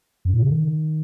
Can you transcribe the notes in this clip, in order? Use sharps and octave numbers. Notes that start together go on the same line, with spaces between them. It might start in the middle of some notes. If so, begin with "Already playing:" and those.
F#2
A#2
C#3
D#3